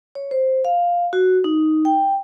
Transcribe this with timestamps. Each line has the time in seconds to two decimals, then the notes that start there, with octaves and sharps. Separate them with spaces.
0.15 C#5
0.31 C5
0.65 F5
1.13 F#4
1.44 D#4
1.85 G5